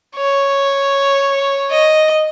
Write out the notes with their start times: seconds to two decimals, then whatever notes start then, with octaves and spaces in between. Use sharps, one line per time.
0.17 C#5
1.70 D#5